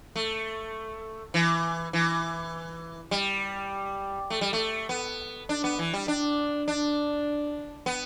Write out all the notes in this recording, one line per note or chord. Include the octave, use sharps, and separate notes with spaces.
A3
E3
E3
G3
A3
G3
A3
B3
D4
B3
E3
G3
D4
D4
B3